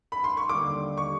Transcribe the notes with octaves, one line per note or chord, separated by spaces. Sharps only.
B5
C6
C#6
D#2 D3 G3 D6
C#6